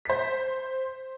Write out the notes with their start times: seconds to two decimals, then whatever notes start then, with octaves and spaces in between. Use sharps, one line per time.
0.05 C5 B6